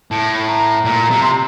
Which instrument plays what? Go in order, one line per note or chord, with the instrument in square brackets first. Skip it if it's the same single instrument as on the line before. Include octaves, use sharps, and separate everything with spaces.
[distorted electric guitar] A2 [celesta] A5
[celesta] A#5
[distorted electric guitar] A#2 [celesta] A#5
[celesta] A#5
[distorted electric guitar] C3
[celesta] C6